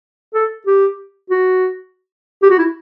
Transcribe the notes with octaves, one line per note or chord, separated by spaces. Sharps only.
A4
G4
F#4
G4
F#4
E4